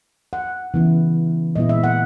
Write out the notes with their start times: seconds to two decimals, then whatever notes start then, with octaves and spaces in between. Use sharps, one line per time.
0.33 F#5
0.74 C#3 E3 B3 E4
1.55 A#2 G#3 B3 E4 D#5
1.69 E5
1.83 F#5